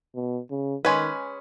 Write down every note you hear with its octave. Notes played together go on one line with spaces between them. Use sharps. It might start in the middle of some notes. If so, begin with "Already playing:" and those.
B2
C#3
D#3 G#3 C#4 B4